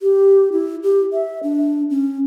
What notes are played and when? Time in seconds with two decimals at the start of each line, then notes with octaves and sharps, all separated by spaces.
0.01 G4
0.52 E4
0.83 G4
1.13 E5
1.43 D4
1.90 C#4